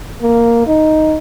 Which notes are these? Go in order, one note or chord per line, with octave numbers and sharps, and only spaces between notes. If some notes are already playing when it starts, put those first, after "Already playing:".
A#3
D#4